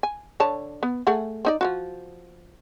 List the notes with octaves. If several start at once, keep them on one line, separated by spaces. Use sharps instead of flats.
G#5
D3 C#5 A5
B3
A3 G#4 F#5
C4 D#4 D5
F3 F4 F#4